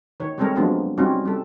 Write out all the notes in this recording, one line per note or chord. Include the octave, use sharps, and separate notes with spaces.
D#3 C#5
G3 G#3 C4 A4 A#4 C#5
F3 F#3 G#3 A#3 B3 D4
G3 C4 C#4 D#4 F4 F#4
G3 A4